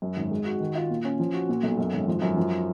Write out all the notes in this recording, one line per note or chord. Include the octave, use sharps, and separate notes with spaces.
F#2
G#1
G#3
F#4
D#3
F4
A#2
C#4
F3
F#4
A#2
B1
F#2
G#1
F3
F#2
F3